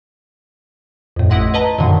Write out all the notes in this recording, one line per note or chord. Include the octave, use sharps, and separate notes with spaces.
F2 A2
A1 E4 D#5 F#5 C6 A#6
B4 D#5 A5 A#5
F#2 A#2 D3 D#3